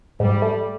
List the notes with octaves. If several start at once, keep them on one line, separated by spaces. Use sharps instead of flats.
G#2 G3
A3